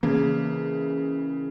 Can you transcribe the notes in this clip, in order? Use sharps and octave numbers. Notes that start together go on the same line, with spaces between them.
C#3 E3 A#3 C#4